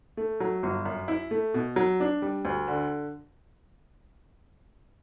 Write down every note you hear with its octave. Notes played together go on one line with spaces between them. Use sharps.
A3
F#3
G1
F#2
E4
A3
B2
F#3
D4
G3
D2
D3